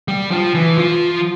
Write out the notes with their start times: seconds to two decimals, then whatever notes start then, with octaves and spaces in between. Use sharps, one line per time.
0.08 G3
0.31 F3
0.55 E3
0.78 F3